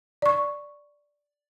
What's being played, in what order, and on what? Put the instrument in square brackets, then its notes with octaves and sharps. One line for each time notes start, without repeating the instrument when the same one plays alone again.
[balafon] D5 C#6